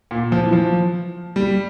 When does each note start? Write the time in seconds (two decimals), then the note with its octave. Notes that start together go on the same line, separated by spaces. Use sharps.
0.11 A#2
0.32 F3
0.44 E3
0.53 F3
1.36 G3